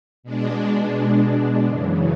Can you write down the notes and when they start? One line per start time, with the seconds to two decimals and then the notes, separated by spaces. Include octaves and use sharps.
0.23 B2 G#3 D4
1.65 F#2 C#3 E3